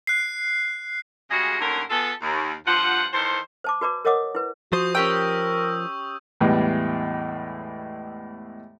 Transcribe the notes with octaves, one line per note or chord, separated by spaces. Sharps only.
F#6 C7
C#3 G3 G#3 F#4 G#4 D#5
D#2 A2 D3 C#4 A#4
B3 F4 G#4 A4
D#2
G2 F3 F4 C5 F#5
D#3 E3 A4 C5
C5 A5 D6
F#4 B4 D5 A#5 D6
A#4 C#5 D#5 F#5 D6 D#6
E4 B4
F3 F#4 C5 C#6 D#6 G6
C#4 G4 A#4 G5 E6
E2 A2 E3 G3 G#3